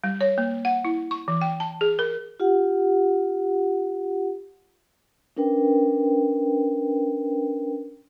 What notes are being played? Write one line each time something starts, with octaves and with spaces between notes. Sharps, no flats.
G3
C#5
A#3
F#5
E4
C#6
E3
G5
A5
G#4
A#4
F4 G4 F#5
C#4 D4 A#4 B4 G5